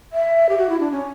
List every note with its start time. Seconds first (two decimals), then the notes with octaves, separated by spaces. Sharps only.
0.13 E5
0.49 G4
0.58 F#4
0.69 E4
0.80 D4
0.92 C#4